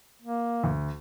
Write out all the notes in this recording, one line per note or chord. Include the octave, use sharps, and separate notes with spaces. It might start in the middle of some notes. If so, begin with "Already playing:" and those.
A#3
D2